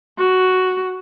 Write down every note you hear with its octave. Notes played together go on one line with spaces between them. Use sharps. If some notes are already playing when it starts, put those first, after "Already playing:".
F#4